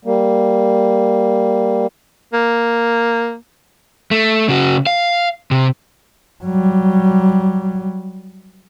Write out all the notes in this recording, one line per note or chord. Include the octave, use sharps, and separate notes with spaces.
G3 A#3
A#3
A3
C#3 F#4
F5
C3
F#3 G3